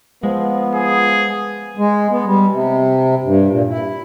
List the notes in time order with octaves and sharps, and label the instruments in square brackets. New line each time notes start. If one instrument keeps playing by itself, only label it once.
[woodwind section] F3 [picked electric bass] G#3 [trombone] B3
[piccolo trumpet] G#4
[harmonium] G#3
B3
G3
C3
G2
A#2
E4